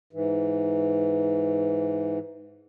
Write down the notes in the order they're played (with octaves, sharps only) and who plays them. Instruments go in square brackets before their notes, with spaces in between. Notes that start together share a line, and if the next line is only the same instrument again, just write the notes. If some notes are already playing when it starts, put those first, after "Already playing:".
[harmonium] G#2 E3